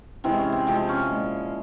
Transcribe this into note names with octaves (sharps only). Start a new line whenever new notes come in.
C3 E3 G#3 C4 E4
C#4
C4
C3 F3 G#3 C4
E4
C#4
A#2 G#3